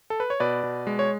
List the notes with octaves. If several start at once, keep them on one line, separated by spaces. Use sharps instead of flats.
A4
B4
C#5
B2 B4 D5
B2
G#3
C#5